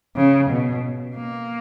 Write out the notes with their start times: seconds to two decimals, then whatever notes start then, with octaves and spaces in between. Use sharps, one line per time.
0.17 C#3
0.51 B2
1.16 A#3